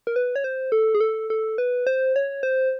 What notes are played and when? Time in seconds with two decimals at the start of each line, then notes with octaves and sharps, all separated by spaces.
0.07 A#4
0.16 B4
0.36 C#5
0.44 C5
0.72 A4
0.95 G#4
1.01 A4
1.30 A4
1.58 B4
1.87 C5
2.16 C#5
2.43 C5